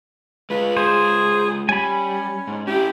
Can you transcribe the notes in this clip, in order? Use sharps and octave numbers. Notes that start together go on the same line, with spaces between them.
G#3 F4 B4
G#4 C5
G3 C#4 G#5 B5
G#2
C#4 E4 G4